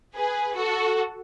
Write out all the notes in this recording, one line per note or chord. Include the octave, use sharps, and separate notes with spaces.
G#4 B4
F#4 A4